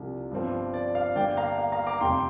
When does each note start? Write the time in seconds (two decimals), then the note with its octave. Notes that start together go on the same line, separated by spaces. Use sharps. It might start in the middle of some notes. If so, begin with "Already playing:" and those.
Already playing: C2 C3 F3 D4
0.31 G1 G2 F3 C4
0.74 D5
0.95 F5
1.15 G2 D3 A#3 D5 G5
1.37 F5 A#5
1.58 F5
1.72 F5 A#5
1.87 A#5 D6
2.01 F1 F2 C3 G5 C6